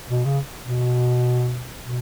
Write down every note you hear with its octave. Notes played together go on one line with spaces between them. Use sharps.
B2
C#3
B2
B2